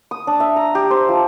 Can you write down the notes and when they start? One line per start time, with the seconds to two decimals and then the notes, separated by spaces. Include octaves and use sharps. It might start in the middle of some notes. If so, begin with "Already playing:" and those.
0.11 D#6
0.27 D4
0.40 E5
0.56 A#5
0.75 G4
0.91 C5
1.09 F3